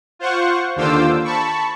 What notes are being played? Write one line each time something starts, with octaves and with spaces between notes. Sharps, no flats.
F4 C5 F#5 C#6
D#2 D3 F4 C5 D6 E6
A5 B5 C#6